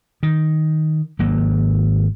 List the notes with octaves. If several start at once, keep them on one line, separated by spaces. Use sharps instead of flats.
D#3
G#1 F#3 A#3